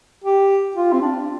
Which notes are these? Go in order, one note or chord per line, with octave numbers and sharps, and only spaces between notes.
G4
F4
C4
D4